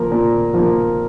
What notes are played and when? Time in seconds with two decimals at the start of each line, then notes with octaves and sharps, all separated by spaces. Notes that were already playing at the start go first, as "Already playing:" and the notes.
Already playing: F3 A#3
0.12 A#2
0.54 F3
0.59 A#3